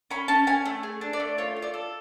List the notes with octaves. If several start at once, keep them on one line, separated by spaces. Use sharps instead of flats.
C#4 B5
C#4 A5
C#4 G#5
A3
G#4
D4
D5
A3
F4 C#5
F4
D5
A4